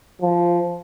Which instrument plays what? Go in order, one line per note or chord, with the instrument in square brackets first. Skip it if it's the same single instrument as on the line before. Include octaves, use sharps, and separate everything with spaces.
[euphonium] F3